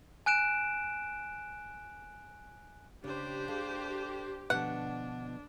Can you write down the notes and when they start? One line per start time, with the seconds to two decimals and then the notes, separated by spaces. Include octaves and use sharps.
0.26 G#5 F#6 D7 E7
3.04 C#3 D4 G4 C5
3.48 G#4 A4 F5
4.50 B2 D3 F3 D4 F#5